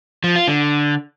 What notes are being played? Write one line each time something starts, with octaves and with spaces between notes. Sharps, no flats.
F3
F4
D3